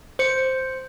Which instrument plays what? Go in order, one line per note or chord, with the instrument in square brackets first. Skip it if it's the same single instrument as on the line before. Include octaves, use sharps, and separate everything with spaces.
[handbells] C5 C#7